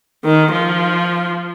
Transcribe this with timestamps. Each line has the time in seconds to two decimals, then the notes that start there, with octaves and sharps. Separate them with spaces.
0.24 D#3
0.52 F3